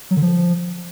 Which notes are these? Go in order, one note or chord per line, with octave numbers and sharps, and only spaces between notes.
F#3
D3
F3